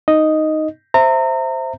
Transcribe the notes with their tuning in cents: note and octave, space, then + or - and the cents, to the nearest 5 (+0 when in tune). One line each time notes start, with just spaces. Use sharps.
D#4 +0 D#5 +0
C5 +0 E5 +0 A#5 -30